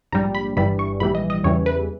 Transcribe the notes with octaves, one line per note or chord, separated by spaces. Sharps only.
A#1 G#2 G3 A#5
B5
G1 G2 E3 G3 B5
C#6
A#1 G#2 E3 G3 B5
D#5
D#5
E2 C#3 E3 G3 C#5
B4